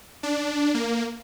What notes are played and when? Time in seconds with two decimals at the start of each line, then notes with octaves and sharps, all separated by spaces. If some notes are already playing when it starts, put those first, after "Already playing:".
0.23 D4
0.74 A#3